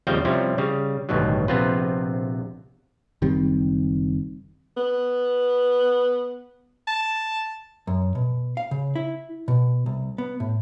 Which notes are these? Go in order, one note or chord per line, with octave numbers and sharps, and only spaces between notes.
D#2 C#3 F3 G3 C4 G5
C3 F3 G3 C4 C#4 E4
C#3 G3
A1 D2 G2 B2 D#3 F#3
A#1 C3 B3 C4 F4 B4
F#1 D#3 G3 C4
B3
A5
F#2
B2
F5
C#3
E4
B2
C2
B3
A2